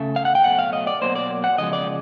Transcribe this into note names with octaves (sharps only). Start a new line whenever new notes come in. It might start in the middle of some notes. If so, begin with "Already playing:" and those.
Already playing: C#3 A3
F5
F#5
G5
B2 F#3 A3 F#5
F5
D#5
D5
B2 F#3 A#3 C5
D5
F#5
C#3 F3 G#3 D#5
D5